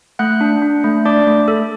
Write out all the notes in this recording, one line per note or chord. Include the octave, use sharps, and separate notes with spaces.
A3 F#5 F#6
D4
D4
A3
D4 D5 D6
A3
A4